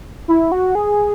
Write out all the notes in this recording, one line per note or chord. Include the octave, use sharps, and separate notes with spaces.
E4
F#4
G#4